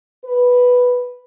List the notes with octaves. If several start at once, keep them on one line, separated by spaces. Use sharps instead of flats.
B4